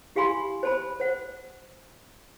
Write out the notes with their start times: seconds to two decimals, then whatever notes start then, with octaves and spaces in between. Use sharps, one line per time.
0.16 E4 G4 F5 G#5 B5 C6
0.63 C5 A5 B5
1.00 C5 F#5